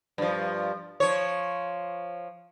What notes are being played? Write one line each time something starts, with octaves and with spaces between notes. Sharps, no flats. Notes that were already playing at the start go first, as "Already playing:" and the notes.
G2 F3
F3 C#5